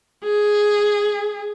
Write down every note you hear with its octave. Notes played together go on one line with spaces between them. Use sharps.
G#4